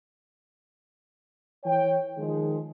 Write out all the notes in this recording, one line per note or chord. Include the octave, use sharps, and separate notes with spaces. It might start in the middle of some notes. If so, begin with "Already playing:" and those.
E3 C#5 G5
D#3 F3 G#3